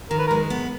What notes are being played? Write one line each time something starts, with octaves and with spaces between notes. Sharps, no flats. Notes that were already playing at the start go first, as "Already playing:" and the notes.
D#3 A#4
B4
A#4
G#3
B3